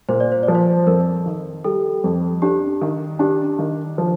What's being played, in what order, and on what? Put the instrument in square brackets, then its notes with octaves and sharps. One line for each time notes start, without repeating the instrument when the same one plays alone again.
[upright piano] A#2 [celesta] C5
[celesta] D5
C5
D5
[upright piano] F3
[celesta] C5
[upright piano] F2 [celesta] A#4
[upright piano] D#3
[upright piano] G3 [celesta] A4
[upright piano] F2
[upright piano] D4 [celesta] G4
[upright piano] D#3
[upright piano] D4 [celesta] G4
[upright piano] D#3
F3